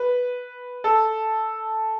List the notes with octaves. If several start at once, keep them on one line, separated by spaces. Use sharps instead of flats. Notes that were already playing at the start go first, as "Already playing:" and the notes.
Already playing: B4
A4